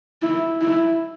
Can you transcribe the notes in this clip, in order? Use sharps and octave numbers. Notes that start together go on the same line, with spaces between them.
E4
E4